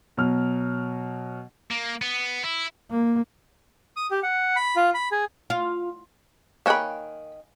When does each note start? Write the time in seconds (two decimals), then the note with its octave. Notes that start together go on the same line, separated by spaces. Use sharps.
0.17 B2 F#3 F6
1.71 A#3
2.02 B3
2.44 E4
2.91 A#3
3.96 D#6
4.11 G4
4.23 F#5
4.56 B5
4.76 F4
4.94 B5
5.12 G#4
5.50 F4
6.66 D#3 A#3 C#5 F5 G5 G#5 B5 F#6